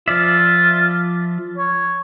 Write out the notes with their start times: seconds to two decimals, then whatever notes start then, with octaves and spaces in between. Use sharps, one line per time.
0.08 F3 F4 D5 E5
1.58 C#5